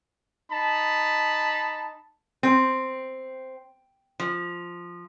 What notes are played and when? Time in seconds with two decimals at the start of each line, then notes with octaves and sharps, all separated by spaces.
0.51 D#4 A5 B5
2.43 C4
4.20 F3